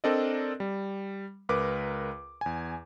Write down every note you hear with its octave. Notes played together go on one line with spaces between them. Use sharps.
C4 D4 A4 A#4 D5 D#5
G3
C#2 A#4 B4 D6
E2 G#5